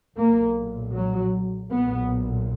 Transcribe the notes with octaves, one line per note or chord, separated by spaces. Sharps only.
B1 A#2 A#3
F#3
B1 A#2 B3